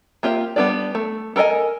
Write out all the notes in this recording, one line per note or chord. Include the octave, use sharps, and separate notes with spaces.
A#3 F4 G4 D5 E5
G3 B3 D4 F4 D5
A3
A4 A#4 C#5 D#5 G#5